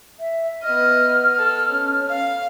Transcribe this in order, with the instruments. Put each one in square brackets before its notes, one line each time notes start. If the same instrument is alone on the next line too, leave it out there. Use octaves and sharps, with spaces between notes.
[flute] E5
[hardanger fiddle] B3 D#5 [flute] F6
[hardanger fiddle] A4
C#4
F5